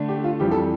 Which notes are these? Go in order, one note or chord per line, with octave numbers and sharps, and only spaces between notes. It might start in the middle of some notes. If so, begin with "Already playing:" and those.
Already playing: D3 A3 D4
G4
F4
F2 E3 G3 G4
A4